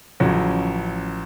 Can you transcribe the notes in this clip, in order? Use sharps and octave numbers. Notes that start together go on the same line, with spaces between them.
A1 C#3 F3 F#3